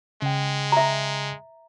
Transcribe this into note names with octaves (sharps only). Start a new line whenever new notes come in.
C#3 G#3 G5
E5 A#5